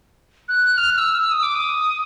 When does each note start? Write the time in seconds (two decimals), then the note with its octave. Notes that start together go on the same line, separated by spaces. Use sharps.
0.49 F#6
0.78 F6
0.94 F6
0.98 E6
1.19 E6
1.31 D#6
1.43 D6
1.55 D#6